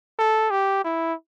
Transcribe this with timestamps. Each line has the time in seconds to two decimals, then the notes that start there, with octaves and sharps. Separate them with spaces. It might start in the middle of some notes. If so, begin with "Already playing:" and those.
0.19 A4
0.51 G4
0.84 E4